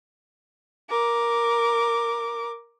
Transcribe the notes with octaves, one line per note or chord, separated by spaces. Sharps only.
A#4 D6